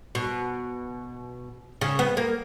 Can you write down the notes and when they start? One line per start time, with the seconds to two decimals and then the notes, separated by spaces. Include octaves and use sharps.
0.15 B2
1.81 C#3
1.99 B3
2.17 A#3